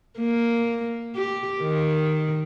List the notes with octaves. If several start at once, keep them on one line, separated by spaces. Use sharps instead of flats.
A#3
G4
D#3